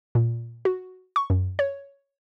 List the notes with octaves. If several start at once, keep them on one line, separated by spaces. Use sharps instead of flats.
A#2
F#4
C#6
F#2
C#5